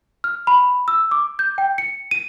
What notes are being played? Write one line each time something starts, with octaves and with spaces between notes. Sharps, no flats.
F6
B5
E6
D6
G6
G5
C#7
D#7